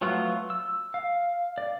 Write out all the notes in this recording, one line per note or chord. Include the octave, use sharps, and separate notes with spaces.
F3 F#3 A3 B3 F4
E6
F5
D5